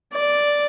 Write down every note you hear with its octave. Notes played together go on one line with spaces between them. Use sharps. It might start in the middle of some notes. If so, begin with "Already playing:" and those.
D5